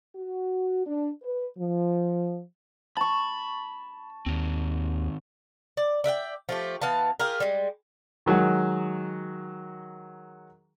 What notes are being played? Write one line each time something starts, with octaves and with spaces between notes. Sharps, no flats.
F#4
D4
B4
F3
A5 B5 C#6
D#2 D#3 C4
D5
D5 E5 F#5 G5
F3 A3 G4
E3 B3 F5 A5
F4 G4 G#4 A#4
G3 G#3
D#3 F#3 G#3 F#4